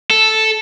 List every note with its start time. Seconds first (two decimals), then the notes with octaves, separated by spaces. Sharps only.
0.10 A4